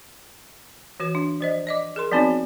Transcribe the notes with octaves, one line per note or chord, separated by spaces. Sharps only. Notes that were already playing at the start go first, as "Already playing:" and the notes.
E3 F#4 B4
D4
F3 C5 D#5
D5 D#5 D6
G#4 A#4 C6
F3 B3 C4 D#4 F#4 C#5